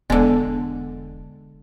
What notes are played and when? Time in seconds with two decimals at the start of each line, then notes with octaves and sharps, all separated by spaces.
0.10 E1 D3 G#3 B3